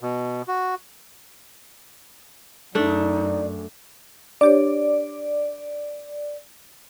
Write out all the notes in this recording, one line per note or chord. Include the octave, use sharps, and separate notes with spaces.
B2
F#4
F#2 A3 D4 D#4 D5
D4 G4 C#5 D5